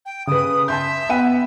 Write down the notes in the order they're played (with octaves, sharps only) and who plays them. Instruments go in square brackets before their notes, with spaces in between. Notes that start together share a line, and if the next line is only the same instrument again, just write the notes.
[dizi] G5
[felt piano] C#3 B4 [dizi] D#6
[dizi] E5 [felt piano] A5 C6 G6
[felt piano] B3 F#5 D#7